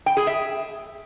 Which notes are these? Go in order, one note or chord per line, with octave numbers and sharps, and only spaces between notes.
G5
G#4
E5